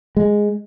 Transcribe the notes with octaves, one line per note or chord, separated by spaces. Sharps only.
G#3